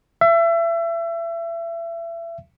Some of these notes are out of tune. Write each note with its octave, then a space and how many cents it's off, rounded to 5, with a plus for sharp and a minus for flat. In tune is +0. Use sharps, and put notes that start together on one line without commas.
E5 +30